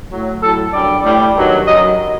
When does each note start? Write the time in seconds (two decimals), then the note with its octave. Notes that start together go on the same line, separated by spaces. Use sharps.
0.10 A2 F#3
0.41 A2 F#3 A4
0.72 F#2 D3 G3 D5
1.04 A2 G3
1.34 G2 D#3 F#3
1.66 F#2 F#3 D#5